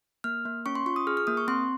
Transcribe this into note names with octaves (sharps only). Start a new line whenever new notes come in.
A#3 F6
A#3
C#4 C#6
C6
F4 C#6
D#6
G#4 F6
F6
A#3 D#6
C#6
C4 C6